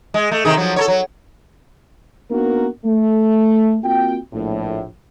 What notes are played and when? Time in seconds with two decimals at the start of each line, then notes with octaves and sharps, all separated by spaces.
0.14 G#3
0.31 A3
0.45 C3 D#3 G#4
0.57 F3 F#3
0.76 A4 A#4 C#5
0.88 F#3
2.31 A#3 B3 D4 D#4 F#4 A#4
2.85 A3
3.83 A#3 C4 F4 F#4 G5
4.33 A#1 A2